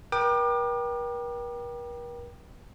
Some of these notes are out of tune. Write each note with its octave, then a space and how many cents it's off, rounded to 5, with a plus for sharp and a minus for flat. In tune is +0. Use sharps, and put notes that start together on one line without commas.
A#4 +45 G5 -5 D6 +35